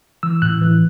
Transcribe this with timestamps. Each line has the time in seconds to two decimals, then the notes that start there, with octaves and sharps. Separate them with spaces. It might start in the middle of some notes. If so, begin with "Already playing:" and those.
0.23 E3 E6
0.42 A2 F#6
0.61 E3